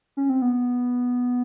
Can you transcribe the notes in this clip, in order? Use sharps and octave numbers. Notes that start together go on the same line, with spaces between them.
C#4
C4
B3